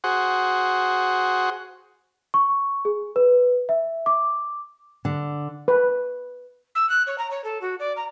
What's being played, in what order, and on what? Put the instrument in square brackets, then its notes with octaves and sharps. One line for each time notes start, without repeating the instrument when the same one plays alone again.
[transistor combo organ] F#4 G#4 C5 F#5
[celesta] C#6
G#4
B4
E5
D6
[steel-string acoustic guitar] D3
[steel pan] B4
[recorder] E6
F#6
C#5
A#5
C#5
A4
F#4
D5
A#5